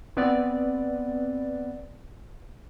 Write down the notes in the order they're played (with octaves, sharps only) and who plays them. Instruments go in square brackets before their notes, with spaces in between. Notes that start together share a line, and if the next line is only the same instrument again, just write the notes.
[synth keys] B3 C4 B4 D5